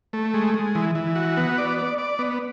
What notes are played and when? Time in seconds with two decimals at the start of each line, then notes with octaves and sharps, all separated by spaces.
0.13 A3
0.34 G#3
0.54 G#3
0.75 E3
0.95 E3
1.16 F#4
1.37 B3
1.58 D5
1.79 D5
1.98 D5
2.19 B3